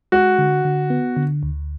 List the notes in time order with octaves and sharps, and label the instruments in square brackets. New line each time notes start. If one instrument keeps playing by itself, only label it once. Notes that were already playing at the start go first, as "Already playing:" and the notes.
[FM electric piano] G#3 [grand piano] F#4
[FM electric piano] D3
D3
B3
D3
D2